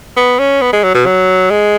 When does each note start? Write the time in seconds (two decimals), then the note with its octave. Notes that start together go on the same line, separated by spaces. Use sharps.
0.17 B3
0.39 C#4
0.62 B3
0.73 G#3
0.84 F#3
0.95 B2
1.06 F#3
1.51 G#3